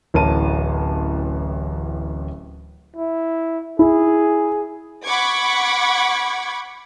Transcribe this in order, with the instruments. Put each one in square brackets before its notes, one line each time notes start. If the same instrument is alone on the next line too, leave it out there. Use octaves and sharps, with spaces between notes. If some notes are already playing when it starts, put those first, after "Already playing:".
[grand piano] D1 A1 A#4 C#5 A5 D#7
[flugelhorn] E4
[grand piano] E4 [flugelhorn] G#4
[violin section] F#5 B5 C#6 D6 G#6